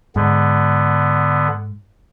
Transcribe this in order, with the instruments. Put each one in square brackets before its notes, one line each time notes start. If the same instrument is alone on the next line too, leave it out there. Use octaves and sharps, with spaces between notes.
[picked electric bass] G#2 [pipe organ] D3 B3